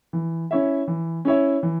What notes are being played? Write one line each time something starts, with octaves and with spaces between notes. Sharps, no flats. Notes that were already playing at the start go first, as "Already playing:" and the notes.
E3
C#4 E4 C#5 E5
E3
C#4 E4 C#5 E5
E3